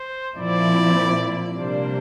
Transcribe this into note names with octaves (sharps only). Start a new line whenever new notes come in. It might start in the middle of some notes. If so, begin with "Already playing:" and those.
Already playing: C5
A#2 F3 C4 E4 D5
C3 G3 A#3 D4 C5